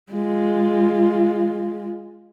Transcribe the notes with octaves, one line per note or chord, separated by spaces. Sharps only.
G#3 F4